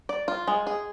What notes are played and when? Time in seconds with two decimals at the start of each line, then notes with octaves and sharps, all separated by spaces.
0.09 D5
0.28 F4
0.48 G#3
0.67 G#4